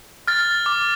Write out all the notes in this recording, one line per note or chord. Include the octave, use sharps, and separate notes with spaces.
F6 A6
D6